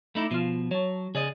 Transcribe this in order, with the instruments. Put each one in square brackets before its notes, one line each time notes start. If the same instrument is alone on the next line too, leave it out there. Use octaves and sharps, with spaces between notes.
[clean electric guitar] A3 D#4 E4 [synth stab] B5 D6
[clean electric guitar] B2 F3 [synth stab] F4 C7
[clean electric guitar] F#3 [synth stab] C#5 A5
[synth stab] C#3 [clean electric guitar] G#4 D5 D#5